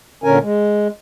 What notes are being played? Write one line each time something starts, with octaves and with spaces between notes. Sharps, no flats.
A#2 D3 C#4 A#4 G#5
G#3